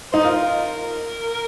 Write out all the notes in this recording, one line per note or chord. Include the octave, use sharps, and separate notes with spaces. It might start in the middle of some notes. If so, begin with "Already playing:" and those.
D#4 C5
F4 A#4